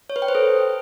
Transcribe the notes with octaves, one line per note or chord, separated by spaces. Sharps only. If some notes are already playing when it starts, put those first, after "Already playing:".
C#5
B4
G5
C5
A4